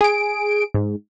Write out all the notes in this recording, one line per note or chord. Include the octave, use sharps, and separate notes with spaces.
G#4 D7
G#2